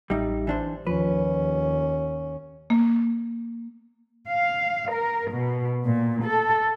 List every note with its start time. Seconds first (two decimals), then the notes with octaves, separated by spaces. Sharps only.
0.10 A1 G3 D#4 E5
0.47 E3 D4 C5
0.87 D#2 F3 C#4 B4
2.70 A#3
4.29 F5
4.93 A#4
5.33 B2
5.85 A#2
6.24 A4